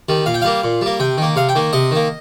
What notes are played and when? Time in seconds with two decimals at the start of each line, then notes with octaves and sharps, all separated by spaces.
0.09 D#3 G3
0.26 A#2 F5
0.34 G5
0.42 G3 A#3 F5
0.64 A#2
0.81 G3 A#3
0.99 C3 G5
1.18 D#3 A#3
1.36 C3 F5
1.49 G5
1.55 D#3 A#3
1.73 C3 D#5
1.91 D#3 A#3